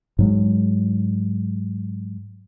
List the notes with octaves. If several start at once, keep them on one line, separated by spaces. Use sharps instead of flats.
G#2 F#3 G#3